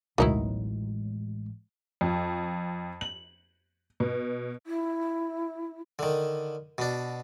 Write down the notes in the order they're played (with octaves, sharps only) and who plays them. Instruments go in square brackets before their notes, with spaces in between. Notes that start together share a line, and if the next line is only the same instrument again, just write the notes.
[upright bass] A1 G#3 [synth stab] D2 B2 F#3 [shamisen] D#3 D#4 E4
[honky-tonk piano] F2
F#7
B2
[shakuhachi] E4
[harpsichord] D3 D#3
B2 D4